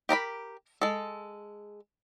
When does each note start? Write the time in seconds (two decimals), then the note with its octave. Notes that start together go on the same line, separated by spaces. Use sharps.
0.09 G4 A#4 A#5 B5
0.81 G#3 A4